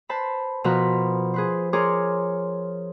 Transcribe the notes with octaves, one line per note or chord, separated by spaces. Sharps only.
B4 C5 A5 B5
B2 F3 A#4 B4 B5
G#4 B4 C5
G#4 A#4 C#5 C6 D6 F6